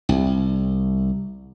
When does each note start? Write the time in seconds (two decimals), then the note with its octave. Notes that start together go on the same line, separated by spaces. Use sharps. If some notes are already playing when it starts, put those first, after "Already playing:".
0.09 C2